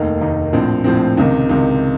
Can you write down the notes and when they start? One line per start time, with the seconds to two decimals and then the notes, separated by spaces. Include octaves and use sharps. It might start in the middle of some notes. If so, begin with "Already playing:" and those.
Already playing: F1 D#2 D#3 A#3 D#4
0.21 F1 D#2 D#3 A#3 D#4
0.53 A#1 A2 F3 C4
0.84 A#1 A2 F3 C4
1.17 C#2 C3 D#3
1.49 C#2 C3 D#3